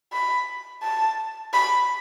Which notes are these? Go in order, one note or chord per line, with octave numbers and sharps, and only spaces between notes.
B5
A5
B5